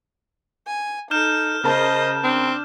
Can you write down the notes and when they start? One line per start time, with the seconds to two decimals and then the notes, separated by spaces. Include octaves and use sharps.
0.67 G#5
1.11 D#4 A4 F6 G6 E7
1.64 C#3 A#4 C5 D#5 A5
2.24 C4 D4